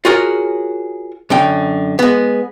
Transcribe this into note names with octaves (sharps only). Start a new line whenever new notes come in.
F4 F#4 G#4 A#4 C#5
F#2 D3 G5
G#3 B3